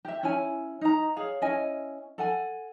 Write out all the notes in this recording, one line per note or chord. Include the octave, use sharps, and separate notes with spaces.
G4 E5
C#4 E4 C#5 G#5
D#4 A#5
G#4 C#5 F5
C#4 E4 D#5 G#5
A4 F#5 G#5